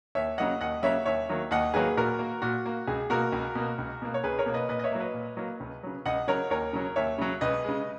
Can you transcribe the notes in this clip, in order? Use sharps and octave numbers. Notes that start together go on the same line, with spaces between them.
D#2 C#5 E5
C#3 F#3 A#3 D#5 F#5
D#2 D#5 F#5
C#3 F#3 A#3 C#5 E5
D#2 C#5 E5
D#3 F#3 A#3
D#2 D#5 F#5
D#3 F#3 A#3 G#4 B4
A#2 F#4 A#4
A#3
A#2 F#4
A#3
C#2 G#4
B2 A#3 F#4 A#4
C#2
B2 A#3
C#2
B2 A#3
C#5
C#2 G#4 B4
A#4 C#5
B2 A#3
B4 D#5
A#2 B4 D#5
D#5
C#5 E5
F#3 A#3
B4 D#5
A#2
F#3 A#3
C#2
C#3 F#3
C#2 D#5 F#5
C#3 F#3 A#4 C#5
D#2 A#4 C#5
C#3 F#3
D#2 C#5 E5
C#3 F#3
C#2 B4 D#5
C#3 G#3